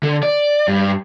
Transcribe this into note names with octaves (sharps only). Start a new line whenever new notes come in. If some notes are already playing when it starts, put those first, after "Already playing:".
D3
D5
G2